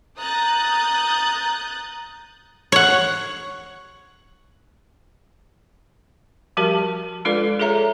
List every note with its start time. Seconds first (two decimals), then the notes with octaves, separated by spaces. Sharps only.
0.18 A#5 D#6 F#6 G6 A6
2.72 C#5 F#5
6.57 F3 G3 F#4 G4 A#4 A5
7.25 G#3 D4 F4 A4 B4 D5
7.59 G#4 A4 C#5 E5 A#5